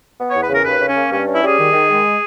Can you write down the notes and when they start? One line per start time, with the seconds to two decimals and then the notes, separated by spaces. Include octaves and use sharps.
0.19 B3
0.30 E2 C#5
0.42 B4
0.50 C#3 A#4
0.65 D#2 B4
0.80 C#3
0.88 C#4
0.96 A#3
1.11 G2 C#4
1.27 C#4
1.35 E4
1.42 G3 G#4
1.58 D#3
1.73 D#3
1.88 G#3